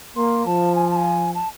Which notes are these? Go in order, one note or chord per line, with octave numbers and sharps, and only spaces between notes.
A#3 C6
F3 A5
G#5
A5
G#5
A5